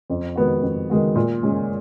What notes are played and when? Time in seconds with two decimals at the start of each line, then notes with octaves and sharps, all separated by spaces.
0.10 F2
0.36 D#3 G#3 B3 F#4
0.62 F2
0.90 D#3 G#3 B3 F#4
1.15 A#2
1.43 G#3 C#4